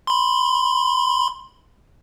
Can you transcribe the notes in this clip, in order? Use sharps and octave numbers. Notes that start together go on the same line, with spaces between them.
B5 C6